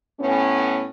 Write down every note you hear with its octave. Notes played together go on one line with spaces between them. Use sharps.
A2 B3 C#4